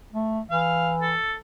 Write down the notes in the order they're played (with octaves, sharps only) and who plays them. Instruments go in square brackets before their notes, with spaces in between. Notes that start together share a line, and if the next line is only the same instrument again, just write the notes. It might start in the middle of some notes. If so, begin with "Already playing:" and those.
[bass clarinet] A3
[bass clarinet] E3 [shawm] F5
[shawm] A4